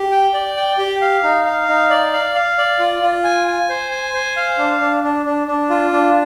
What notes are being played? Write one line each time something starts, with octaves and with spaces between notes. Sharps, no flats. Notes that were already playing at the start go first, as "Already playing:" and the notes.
Already playing: G4
G5
D5
G5
G4
F5
D#4
F5
D#4
D5
F5
F5
D5
F4
F4
G#5
G#5
C5
G#5
C5
F5
D4
D4
D4
D4
D4
F4
D4